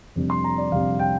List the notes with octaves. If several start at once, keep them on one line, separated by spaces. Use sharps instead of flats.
F2 C3 G3 D4
C6
A#5
D5
F2 C3 G3 D4 F5
G5